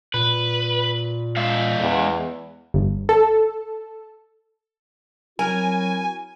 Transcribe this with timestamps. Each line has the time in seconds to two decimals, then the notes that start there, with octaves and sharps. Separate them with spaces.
0.14 A#2 B4
1.37 G#3 E5 F5
1.80 E2
2.74 G1
3.09 A4
5.39 F#3 C4 E4 F#4 A#4 G#5